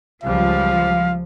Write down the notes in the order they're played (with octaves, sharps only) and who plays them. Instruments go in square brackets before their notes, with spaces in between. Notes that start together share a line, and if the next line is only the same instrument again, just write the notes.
[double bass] C#2 G3 [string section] F3 [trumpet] F5